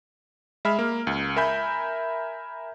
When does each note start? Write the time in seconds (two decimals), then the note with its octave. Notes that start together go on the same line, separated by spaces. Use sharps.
0.65 G#3 E5 B5 F6
0.79 A#3
1.07 C#2
1.36 A#4 E5 G#5 B5 G6